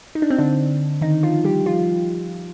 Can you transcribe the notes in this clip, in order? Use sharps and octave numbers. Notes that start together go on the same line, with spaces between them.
D#4
D4
C4
D3 D4
D#3 D#4
F3 F4
G3 G4
F3 F4